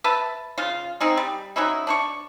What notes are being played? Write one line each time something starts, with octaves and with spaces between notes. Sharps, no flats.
B4 E5 A5
C#3 F4
C4 D#4 G#4
G3
F#3 C#4 D#4 E4
D4 C5 C#6